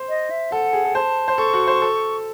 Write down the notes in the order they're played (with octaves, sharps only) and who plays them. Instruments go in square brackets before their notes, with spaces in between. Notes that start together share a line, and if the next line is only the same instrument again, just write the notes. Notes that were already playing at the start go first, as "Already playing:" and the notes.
Already playing: [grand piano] C5
[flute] D#5
E5
[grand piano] A4 [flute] F#5
[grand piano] G#4
A4
[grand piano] C5 [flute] A5
[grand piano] C5
[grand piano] A4 [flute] C#6
[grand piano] F#4
C5
A4